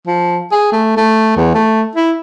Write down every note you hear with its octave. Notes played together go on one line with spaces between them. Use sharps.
F3
G#4
A3
A3
E2
A3
E4